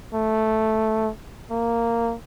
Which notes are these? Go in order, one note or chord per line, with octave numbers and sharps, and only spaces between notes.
A3
A#3